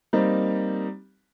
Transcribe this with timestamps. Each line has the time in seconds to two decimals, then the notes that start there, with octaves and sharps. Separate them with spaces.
0.13 G3 A#3 C4 D#4